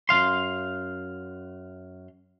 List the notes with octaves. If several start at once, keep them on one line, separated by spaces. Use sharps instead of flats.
F#2 F3 F5 C6